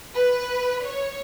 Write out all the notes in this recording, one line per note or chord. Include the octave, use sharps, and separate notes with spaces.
B4
C#5